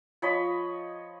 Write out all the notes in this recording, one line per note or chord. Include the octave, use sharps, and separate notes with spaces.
F3 C#5 D#5 B5